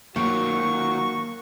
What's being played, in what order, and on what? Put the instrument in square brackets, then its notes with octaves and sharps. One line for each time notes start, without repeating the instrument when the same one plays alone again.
[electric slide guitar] D#3 F#3 [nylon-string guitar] A#3 [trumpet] F#4 [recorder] C#6